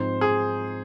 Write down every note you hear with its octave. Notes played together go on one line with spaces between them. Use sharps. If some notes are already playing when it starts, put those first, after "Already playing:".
Already playing: G#2 F3 C4 D#4 C5
G#4